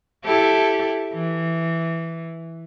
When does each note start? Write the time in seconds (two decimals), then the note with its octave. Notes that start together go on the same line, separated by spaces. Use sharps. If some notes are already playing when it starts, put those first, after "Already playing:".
0.24 E4 G4 A4
1.13 E3